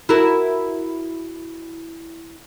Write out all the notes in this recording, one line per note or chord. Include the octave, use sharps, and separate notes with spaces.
E4 F#4 A#4